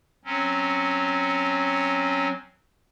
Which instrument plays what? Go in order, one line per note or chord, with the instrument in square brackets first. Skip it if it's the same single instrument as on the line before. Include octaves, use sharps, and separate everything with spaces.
[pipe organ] F#3 C4 C#4